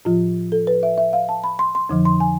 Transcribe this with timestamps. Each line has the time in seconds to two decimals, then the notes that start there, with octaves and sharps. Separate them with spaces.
0.05 A2 F3 F4
0.52 A4
0.67 B4
0.83 E5
0.98 E5
1.13 F5
1.29 A5
1.44 B5
1.59 C6
1.75 C6
1.89 F2 D3 F3
2.05 C6
2.20 G#5